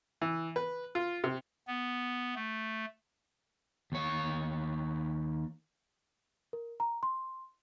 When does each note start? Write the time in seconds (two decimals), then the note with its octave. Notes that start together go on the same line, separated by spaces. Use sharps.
0.21 E3
0.56 B4
0.95 F4
1.24 C3
1.67 B3
2.35 A3
3.92 D#2 C#5
6.53 A#4
6.80 A#5
7.03 C6